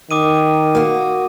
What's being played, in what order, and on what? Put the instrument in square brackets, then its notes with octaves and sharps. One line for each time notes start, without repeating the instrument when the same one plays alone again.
[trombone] D#3 [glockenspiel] D6 D#6 D#7
[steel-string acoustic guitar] A#3 F#4